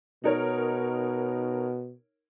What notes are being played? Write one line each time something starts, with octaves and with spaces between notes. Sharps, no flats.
B2 D#4 A#4 C#5